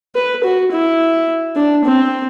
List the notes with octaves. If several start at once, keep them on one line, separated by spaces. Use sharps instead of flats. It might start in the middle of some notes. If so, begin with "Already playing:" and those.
B4
F#4
E4
D4
C4